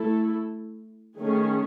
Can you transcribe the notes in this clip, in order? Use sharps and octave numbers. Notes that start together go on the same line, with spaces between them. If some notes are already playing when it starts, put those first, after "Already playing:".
Already playing: A3 E4 A4
D#3 A3 C#4 G#4